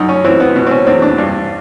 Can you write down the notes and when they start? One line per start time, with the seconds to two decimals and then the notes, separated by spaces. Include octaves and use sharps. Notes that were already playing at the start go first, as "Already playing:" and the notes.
Already playing: F#2 D#4
0.09 C#4
0.24 E3 C4
0.40 B3
0.56 B2
0.67 C4
0.71 C#4
0.87 E2 C4
1.02 D4
1.18 G2